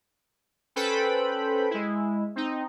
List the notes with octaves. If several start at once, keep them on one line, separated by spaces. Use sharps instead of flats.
C#4 A4 B4 C5 G5 B5
G#3 E4
C4 D#4